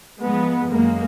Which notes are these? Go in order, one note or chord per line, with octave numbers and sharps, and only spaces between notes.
G#2 F3 G#3 B3
F#2 D#3 G#3 A#3